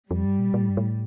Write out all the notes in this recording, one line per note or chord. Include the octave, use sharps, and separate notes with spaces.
F2 G3
G2
A#2
A#2
A2
G2
A2